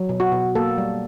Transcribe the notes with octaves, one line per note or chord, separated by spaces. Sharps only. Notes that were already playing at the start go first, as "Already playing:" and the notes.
Already playing: F#3
B2
F#4
B2
A#3 A4
G3